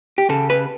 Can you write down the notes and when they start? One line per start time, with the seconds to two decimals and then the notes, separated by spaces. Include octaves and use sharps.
0.18 G4
0.29 C#3 A4
0.50 B4